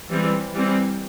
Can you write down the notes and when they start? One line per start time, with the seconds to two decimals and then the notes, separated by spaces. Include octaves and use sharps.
0.11 E3 G3 C4
0.54 E3 G3 C4